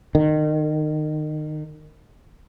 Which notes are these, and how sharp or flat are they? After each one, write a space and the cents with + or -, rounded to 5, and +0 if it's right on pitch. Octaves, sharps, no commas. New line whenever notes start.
D#3 -25